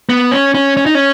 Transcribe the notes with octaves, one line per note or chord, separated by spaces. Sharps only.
B3
C#4
C#4
C#4
D#4
C#4